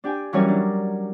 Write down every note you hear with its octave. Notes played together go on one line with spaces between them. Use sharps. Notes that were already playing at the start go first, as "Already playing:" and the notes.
D4 G4 G5 G#5
E3 F#3 G3 C#4 A#4 C#5
D4